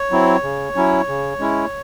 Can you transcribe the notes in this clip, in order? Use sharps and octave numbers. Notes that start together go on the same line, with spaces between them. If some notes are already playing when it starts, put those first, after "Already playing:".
Already playing: C#5
F#3 C4 E4
C#3
F#3 C#4 E4
C#3
G#3 C#4 E4